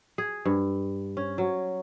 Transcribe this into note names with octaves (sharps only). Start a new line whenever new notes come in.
G#4
G2
C#4
F#3